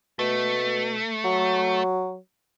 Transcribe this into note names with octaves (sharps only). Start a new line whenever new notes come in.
B2 A3
F#3